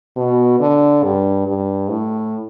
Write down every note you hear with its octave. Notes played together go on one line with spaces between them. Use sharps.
B2
D3
G2
G2
A2